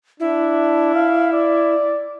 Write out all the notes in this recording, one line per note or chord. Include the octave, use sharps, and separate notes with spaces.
D4 E4
F5
D5